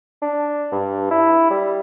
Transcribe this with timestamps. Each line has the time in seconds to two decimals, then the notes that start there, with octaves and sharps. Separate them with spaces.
0.22 D4
0.72 G2
1.11 E4
1.51 G3